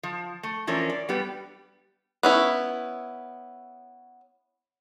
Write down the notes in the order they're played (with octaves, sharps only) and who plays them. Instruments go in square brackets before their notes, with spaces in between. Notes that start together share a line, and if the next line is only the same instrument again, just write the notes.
[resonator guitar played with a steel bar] F3
A3
E3 F3 C#4 D4 A#4
D5
G3 B3 G4 B4
[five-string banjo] B3 C#4 E4